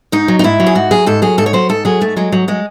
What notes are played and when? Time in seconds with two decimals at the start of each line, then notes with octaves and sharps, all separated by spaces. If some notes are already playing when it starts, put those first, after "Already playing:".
0.12 G#2 D#4
0.28 F#3
0.39 D#4
0.44 G#2 E4
0.60 F#3
0.66 G#4
0.75 G#2 F#4
0.91 F#3 G#4
1.06 G#2 A4
1.22 F#3 G#4
1.38 G#2 A4
1.46 C#5
1.53 F#3 C5
1.69 G#2 A4
1.85 F#3 G#4
2.01 G#2 A3
2.16 F#3 G#3
2.32 G#2 F#3
2.48 F#3 G#3